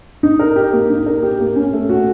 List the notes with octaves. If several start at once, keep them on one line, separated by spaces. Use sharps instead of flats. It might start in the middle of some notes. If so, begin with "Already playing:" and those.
D#4
A#4
G4
A#3
D#4
A#4
G4
A#3
C#4
A3
F#4